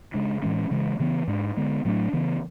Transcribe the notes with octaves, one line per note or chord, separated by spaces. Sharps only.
C#3 G#3 D4
A2 E3 G#3 C#4
C#3 E3 G#3
C#3 E3 B3
G#2 G#3 D4
D3 G#3 B3
A2 F#3 A3 D4
C#3 E3 B3